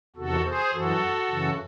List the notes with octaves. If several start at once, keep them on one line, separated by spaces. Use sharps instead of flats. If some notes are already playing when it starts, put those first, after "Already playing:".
E2 C3 D#3 F#4 A4
G#4 C5
F#2 E3 F#4 A4
F#2 C#3 E3